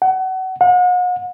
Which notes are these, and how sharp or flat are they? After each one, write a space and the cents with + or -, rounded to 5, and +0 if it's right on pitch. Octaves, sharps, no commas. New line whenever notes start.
F#5 +30
F#5 -40